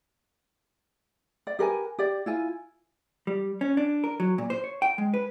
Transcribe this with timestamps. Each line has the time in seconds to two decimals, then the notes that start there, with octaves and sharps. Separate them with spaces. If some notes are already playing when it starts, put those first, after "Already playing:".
1.47 D5
1.59 G4 A#4 B4 G#5
1.99 G4 D5
2.26 E4 F4 G#5
3.27 G3
3.61 C#4
3.77 D4
4.04 A#4
4.20 F#3
4.38 A#2
4.50 C5
4.64 C#5
4.82 G5
4.98 G#3
5.14 B4